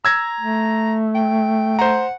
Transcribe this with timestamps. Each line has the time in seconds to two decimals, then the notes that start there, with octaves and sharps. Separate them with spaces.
0.05 A#5 E6 G#6 A#6
0.40 A3
1.15 G5
1.79 C5 F#5 A#5